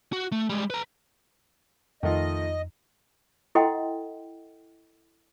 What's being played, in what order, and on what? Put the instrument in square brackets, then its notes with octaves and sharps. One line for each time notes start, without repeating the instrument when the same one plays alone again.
[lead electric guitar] F#4
A3
G3 G#3
B4 A#5
[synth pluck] F2 [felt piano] D#3 A3 F4 [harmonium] D#5
[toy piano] E4 A4 D#5 F#5 G5 C6